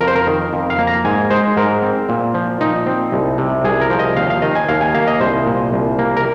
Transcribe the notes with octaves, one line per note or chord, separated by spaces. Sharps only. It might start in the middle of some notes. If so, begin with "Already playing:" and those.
F2 A#4
C5
A#4
D#3
F2
F5
A#3
A#5
G#2 G#5
G#3 C5
G#2 A#4
C4
A#2
F3
A#2 D#4
C4
C2
C3
C2 G#4
A#4
F3
D#5
D#2 F5
F5
D#3 D#5
G#5
D#2 F5
G#5
A#3 F5
D#5
C2 C5
A#2
C2
A#3
A#4